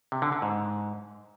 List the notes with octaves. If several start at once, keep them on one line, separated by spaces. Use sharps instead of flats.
C3
D3
D3
G#2